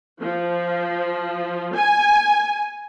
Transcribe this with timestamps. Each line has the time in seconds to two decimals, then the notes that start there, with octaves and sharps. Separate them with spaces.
0.20 F3
1.74 G#5